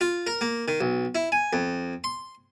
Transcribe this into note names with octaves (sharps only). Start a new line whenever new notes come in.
F4
A#4
A#3
D#3
B1
E4
G#5
F2
C6